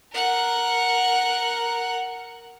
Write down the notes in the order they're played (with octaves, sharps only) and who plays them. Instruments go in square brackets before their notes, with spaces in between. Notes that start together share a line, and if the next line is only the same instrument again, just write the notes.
[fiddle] A#4 F#5